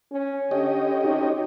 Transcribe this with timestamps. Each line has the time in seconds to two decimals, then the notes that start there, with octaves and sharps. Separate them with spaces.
0.12 C#4
0.51 D3 C#4 G4 D#5
1.04 C3 D#4 F#4